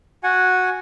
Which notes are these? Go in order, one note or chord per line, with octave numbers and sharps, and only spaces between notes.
F#4 F#5 G#5